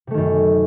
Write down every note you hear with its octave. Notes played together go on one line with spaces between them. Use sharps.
F#2 C3 D#3 A3